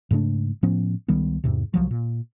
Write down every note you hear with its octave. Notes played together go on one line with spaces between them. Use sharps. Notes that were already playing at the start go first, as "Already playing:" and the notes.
G#2 C#3 A3 D4
A2 F3 B3 C#4
C#2 D#3 G3 B3
E2 G#2 C3
C2 F3 F#3
A#2